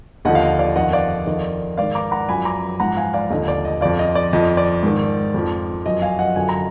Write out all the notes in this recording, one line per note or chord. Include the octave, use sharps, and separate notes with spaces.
D#2 D3 F3 D#5 F#5
F5
D#5
D5 F5
F2 D#3 D#5 F#5
D5 F5
F2 D#3 D#5
G#2 D#3 D5 F5
A#5 D6
F#5 A#5
F#2 F3 G#5 B5
A#5 D6
G#2 F3 F#5 A#5
F5 G#5
D5 F5
D#2 D3 F3 D#5
D5
D#5
F2 F3 D5 F5
D#5
D5
F2 F3 D#5
D5
G#2 D#3
F2 F3
F#2 F3 D#5
F5 G#5
D#5 F#5
F#2 D3 F3 G#5
A#5